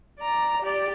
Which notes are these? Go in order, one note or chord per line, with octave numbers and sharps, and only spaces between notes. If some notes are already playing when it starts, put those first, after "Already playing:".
D5 A#5
G4 D5